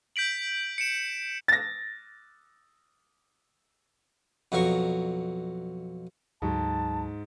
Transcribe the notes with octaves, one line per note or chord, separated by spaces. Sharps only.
G6 B6 D7 F#7
C#7 D7 E7
A6 A#6
F2 B2 F#3 A#4 C#6
D2 G#2 F#3 A5